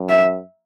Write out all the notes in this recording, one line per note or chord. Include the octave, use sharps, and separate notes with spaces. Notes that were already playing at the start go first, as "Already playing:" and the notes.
Already playing: F#2
E5